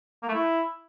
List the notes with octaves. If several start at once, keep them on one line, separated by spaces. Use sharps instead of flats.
A#3
A3
E4